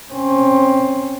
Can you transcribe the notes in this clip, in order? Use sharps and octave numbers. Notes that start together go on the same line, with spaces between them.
C4 C#4